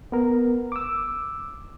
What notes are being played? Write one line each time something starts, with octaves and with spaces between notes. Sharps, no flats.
B3 A#4
D6 E6